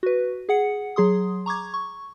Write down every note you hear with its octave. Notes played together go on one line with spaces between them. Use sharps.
F#4 B4
G#4 F#5 C#7
F#3 G#4 C6 D#6
A#5 C#6 D6 G#6
C#6